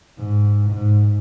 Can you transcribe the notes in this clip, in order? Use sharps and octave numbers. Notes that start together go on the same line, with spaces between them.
G#2
G#2